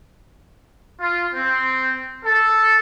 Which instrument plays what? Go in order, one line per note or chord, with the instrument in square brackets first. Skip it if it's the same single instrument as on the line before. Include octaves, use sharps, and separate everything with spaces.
[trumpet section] F4
C4
A4